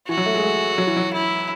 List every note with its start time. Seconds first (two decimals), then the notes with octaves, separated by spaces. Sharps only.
0.09 E3 F#4
0.17 F#3
0.26 A3
0.35 G#3
0.43 A3
0.78 F#3
0.87 E3
0.97 F#3
1.13 E4